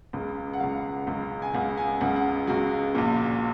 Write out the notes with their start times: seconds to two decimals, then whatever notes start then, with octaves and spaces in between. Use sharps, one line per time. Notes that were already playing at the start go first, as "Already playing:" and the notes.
0.13 C#2 C#3
0.53 F#5
0.60 C#2 C#3 F5
1.07 C#2 C#3
1.42 G#5
1.53 C#2 C#3 F#5
1.78 G#5
2.00 C#2 C#3 F#5
2.16 F#5
2.47 C#2 C#3 F#4
2.95 A#1 A#2